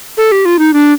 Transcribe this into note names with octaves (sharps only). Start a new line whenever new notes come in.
A4
G4
F4
D#4
D4